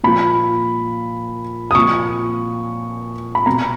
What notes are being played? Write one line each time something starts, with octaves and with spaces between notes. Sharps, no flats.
A#2 F3 B5
D#6
A#2 F3 C#6
B5
B2 A#5